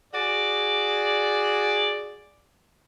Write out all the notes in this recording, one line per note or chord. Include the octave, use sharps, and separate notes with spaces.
F#4 G#4 D5